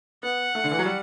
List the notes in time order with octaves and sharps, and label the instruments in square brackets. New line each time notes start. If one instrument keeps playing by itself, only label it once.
[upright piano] B3 [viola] F#5
[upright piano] A3
D3
E3
F#3
G3